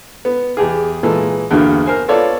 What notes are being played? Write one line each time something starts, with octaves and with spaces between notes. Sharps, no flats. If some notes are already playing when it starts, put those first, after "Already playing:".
B3
E2 G4 G#4
A#2 E3 G#3 A4
E2 G2 D3 A#3 F#4
A#4 C5 G#5
B3 F4 A4 C#5 D5